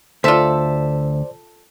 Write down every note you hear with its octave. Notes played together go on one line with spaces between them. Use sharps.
D2 F4 A4 C5 D5 E5